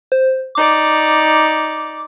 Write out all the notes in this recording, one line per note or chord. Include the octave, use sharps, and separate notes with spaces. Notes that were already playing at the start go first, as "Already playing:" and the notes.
C5
D#4 D5 D6